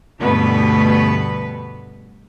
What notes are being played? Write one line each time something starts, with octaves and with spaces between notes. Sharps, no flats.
D2 G2 B2 A3 B3 B4